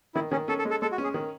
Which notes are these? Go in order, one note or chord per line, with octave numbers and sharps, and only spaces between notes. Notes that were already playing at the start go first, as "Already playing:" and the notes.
D#3 E4
D#3 C#4
C#4 A4
A4
G#3
A4
G#3 A4
F#4
C#4
G#4
D#3